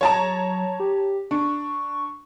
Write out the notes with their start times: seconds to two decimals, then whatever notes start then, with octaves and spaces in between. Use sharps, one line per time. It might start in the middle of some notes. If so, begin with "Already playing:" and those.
0.01 F#3 C#5 A5 A#5
0.80 G4
1.31 D4 C#6